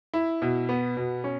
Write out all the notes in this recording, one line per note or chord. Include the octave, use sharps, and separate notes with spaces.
E4
B2
B3
B2
C#4